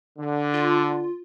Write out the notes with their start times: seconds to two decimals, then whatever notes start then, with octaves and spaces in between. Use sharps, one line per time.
0.18 D3
0.54 F4